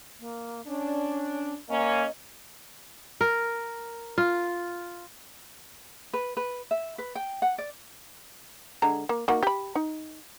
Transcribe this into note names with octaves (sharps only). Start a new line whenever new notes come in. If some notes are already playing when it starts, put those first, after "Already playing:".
A#3
C#4 D4
A#3 C#4 D#5
A#4
F4
B4
B4
E5
B4
G5
F#5
D5
D3 G#3 A#5
A#3
A#3 D#4 F#4
G4 B5
D#4